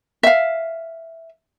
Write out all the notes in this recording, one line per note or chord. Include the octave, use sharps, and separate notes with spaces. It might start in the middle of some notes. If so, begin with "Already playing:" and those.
E5 F5